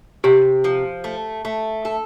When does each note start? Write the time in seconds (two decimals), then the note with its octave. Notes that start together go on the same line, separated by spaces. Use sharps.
0.24 C3 G4
0.64 F3
1.04 A3
1.45 A3
1.85 A4